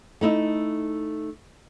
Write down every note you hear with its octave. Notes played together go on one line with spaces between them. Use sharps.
A3 D#4 E4 D#5